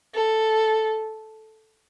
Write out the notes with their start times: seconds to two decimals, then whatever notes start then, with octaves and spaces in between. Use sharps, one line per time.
0.14 A4